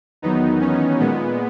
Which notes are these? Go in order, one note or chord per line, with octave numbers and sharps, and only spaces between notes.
E2 D#3 F#3 B3 D#4
C#4
A#2 G#3 B3